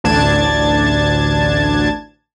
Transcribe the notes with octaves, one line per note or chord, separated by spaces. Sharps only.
A1 D2 D4 A5 G#6 A6